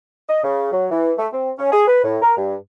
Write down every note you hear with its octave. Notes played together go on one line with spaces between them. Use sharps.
D#5
C#3
F#3
E3
A3
C4
C#4
G#4
B4
A2
A#4
G2